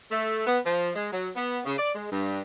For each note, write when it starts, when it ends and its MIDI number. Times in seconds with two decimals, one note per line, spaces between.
0.12 0.46 57
0.47 0.59 59
0.66 0.91 53
0.96 1.10 56
1.13 1.29 54
1.36 1.60 59
1.65 1.74 49
1.78 1.93 74
1.95 2.09 56
2.12 2.42 43